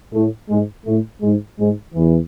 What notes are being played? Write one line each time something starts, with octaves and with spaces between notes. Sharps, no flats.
A2 A3
G#2 G#3
A2 A3
G#2 G#3
G#2 G#3
E2 E3